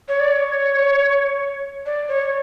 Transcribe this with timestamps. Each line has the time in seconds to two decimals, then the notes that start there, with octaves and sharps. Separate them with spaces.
0.08 C#5
0.20 D5
0.32 C#5
1.86 D5
2.08 C#5